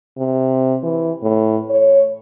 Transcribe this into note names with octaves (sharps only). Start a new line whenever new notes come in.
C3
E3
A2
C#5